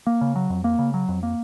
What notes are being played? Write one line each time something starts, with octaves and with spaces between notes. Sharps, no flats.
A#3
C#3
F#3
F2
A#3
C#3
F#3
F2
A#3